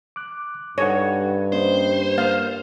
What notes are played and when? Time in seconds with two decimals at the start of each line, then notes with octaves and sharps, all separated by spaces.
0.16 D6 F#6
0.78 G2 D#4 A4 C#5 F#5
1.52 A#3 C#4 C5 D#5
2.18 A#3 F5